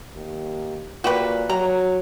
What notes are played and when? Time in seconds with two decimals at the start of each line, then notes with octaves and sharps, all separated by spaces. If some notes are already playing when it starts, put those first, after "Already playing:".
0.15 D#2
1.04 A#2 F#4 G4 B4
1.49 F#3 A#5